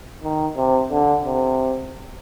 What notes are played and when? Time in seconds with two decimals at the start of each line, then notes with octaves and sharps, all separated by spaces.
0.23 D#3
0.57 C3
0.91 D3
1.26 C3